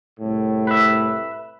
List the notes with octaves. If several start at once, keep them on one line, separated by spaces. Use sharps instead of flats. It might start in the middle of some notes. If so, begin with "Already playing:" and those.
C2 A2
B4 E5